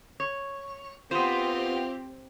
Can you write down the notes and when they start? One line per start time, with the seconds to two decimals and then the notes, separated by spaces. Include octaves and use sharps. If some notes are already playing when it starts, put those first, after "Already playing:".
0.20 C#5
1.11 B3 C4 F4 G4 C5